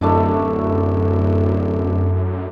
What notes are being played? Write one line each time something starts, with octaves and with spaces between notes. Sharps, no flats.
D1 F#2 A3 D4 E4